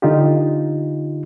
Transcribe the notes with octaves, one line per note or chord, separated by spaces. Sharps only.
D3 D#4 F4 G4